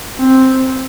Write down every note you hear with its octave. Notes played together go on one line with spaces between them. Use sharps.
C4